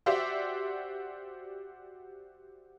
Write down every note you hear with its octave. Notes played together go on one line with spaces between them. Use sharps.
F#4 G4 C5 D5 E5